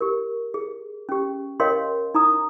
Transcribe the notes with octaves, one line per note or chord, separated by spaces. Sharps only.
G4 A#4
G#4
C#4 G4
A#4 C#5 D#5 F5 G5 C6
D#4 A#5 D#6